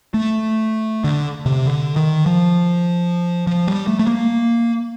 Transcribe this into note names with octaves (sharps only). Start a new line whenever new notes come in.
A3
D3
C3
D3
D#3
F3
F3
G3
A3
A3
A#3